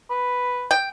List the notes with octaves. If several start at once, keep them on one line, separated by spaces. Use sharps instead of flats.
B4
G5